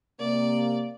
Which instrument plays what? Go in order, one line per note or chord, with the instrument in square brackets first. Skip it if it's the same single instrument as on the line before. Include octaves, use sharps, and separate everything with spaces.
[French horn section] C3 A#3 [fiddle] D5